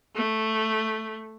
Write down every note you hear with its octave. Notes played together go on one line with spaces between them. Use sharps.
A3